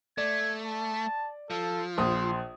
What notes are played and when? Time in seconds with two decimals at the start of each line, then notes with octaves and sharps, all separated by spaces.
0.18 A3 D5 G#6
0.64 A5
1.50 F3 A4
1.98 A#1 C6 D#6